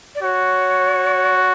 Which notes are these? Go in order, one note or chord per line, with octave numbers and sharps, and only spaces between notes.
D5
F#4 C#5